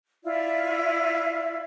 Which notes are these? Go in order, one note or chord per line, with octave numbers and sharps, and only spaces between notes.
E4 F4 D5 E5